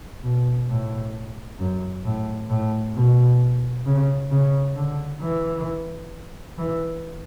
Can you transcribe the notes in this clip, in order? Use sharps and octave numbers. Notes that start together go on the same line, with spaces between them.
B2
A2
F#2
A2
A2
B2
C#3
C#3
D3
E3
E3